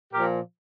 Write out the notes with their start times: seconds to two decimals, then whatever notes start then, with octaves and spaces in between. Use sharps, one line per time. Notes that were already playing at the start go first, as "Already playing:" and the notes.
0.13 A#2 F3 G4 A#4